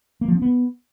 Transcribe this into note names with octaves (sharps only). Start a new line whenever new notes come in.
A#3
F3
C4
B3